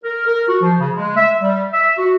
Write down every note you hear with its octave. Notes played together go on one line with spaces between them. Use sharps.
A#4
A#4
F#4
F3
C#3
G#3
E5
G3
E5
F#4